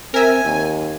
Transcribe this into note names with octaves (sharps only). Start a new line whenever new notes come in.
C4 A#4 E5 G#5
D#2